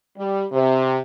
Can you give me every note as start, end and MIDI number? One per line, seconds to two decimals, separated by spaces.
0.18 0.44 55
0.53 0.98 48